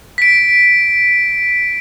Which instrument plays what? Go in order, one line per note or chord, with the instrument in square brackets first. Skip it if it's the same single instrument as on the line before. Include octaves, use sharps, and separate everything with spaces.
[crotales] B6 D7